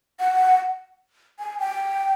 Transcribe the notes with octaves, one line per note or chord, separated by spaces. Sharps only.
F#5
G#5
G5